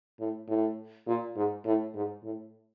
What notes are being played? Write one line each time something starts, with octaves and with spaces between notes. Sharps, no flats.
A2
A2
A#2
G#2
A2
G#2
A2